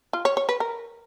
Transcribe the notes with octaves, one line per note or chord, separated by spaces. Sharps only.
F4
C#5
C#5
B4
A#4